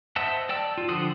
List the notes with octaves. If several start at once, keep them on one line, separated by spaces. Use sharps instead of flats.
C5 D#5 E5 F#5 A5
D5 G5 A5 E6
F4
D3 F3 C5 F#5 D#6